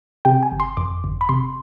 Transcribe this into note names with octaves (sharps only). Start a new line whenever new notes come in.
C3 G5
G#5
G1
C6
F2 D6
G1
B5
C3 C6